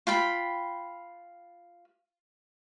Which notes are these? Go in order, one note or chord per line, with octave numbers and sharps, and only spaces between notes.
F4 G5 B5